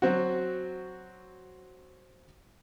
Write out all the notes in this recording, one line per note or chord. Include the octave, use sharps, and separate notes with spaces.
F#3 C4 F#4